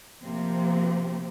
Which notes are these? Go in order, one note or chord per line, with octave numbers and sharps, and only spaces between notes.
C3 F3 A#3 C4